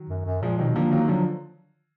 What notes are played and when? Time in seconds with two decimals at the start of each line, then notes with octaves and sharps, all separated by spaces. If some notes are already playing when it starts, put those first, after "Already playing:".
Already playing: D#3 F#3
0.09 F#2
0.25 F#2
0.42 A#2 F3 G#3
0.58 B2 D#3 F#3
0.75 D3 F3 A#3
0.91 D#3 F#3 A#3
1.08 D3 F3 F#3